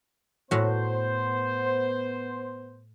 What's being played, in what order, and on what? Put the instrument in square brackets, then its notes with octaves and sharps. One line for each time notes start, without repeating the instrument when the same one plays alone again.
[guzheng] A2 F#4 [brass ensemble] B3 C5